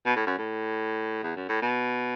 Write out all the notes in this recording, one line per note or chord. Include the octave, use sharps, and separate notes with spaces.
B2
A2
F#2
A2
E2
F#2
A2
B2